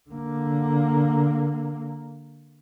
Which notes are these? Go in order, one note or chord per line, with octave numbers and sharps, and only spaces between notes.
D3 A#3